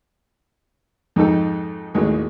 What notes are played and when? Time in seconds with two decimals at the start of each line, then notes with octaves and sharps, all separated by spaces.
1.16 F2 G#2 D#4 A4 G5
1.94 A1 D#2 F#3 G#3